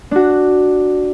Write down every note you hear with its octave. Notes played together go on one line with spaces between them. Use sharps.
D4 F#4